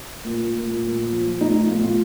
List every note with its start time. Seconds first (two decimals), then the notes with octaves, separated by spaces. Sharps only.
0.24 A#2
0.39 A#2
0.54 A#2
0.67 A#2
0.83 A#2
0.97 A#2
1.12 F3
1.27 F3
1.41 A2 D#4
1.55 F3 D#4
1.69 A2 F4
1.83 A2 F4